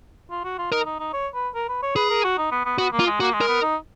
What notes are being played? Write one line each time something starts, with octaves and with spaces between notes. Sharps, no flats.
F4
F#4
F4
D#4 A#4
D#4
D#4
C#5
B4
A#4
B4
C#5
G#4 B4
A#4
F#4
D#4
B3
B3
B3 F#4
A#3
F4
G#3
A#3 F#4
G#3
A#4
B3
D#4